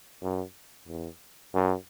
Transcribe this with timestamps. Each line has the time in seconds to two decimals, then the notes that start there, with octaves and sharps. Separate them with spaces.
0.22 F#2
0.88 E2
1.54 F#2